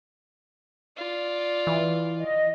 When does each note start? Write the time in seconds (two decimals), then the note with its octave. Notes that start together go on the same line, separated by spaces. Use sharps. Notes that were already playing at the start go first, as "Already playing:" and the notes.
0.96 F4 D5
1.67 E3
2.18 D#5